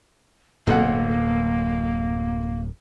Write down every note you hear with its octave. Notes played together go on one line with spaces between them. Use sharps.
D1 B1 F#2 A2 A#3 A4 F#5